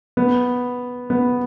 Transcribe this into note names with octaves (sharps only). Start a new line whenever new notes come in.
B3
B3